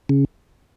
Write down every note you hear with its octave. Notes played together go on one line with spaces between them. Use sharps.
C#3